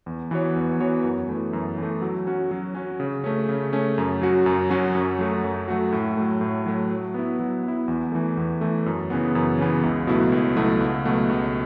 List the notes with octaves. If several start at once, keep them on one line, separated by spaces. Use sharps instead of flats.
E2
E3 B3 F#4 C#5
E2
E3 B3 F#4 C#5
F#2
E3 A3
F#2
E3 A3
F#3
C#4 F#4
F#3
C#4 F#4
C#3
A3 C#4
C#3
A3 C#4
F#2
F#3 C#4 F#4
F#2
F#3 C#4 F#4
F#2
F#3 A3 F#4
F#2
F#3 A3 F#4
A2
F#3 A3
A2
F#3 A3
F#3
B3 E4
F#3
B3
E4
E2
E3 A3
E2
E3 A3
F#2
C#3 E3 B3
F#2
C#3 E3 B3
C#2
B2 F#3 A3 E4
C#2
B2 F#3 A3 E4
C#2
B2 F#3 A3
C#2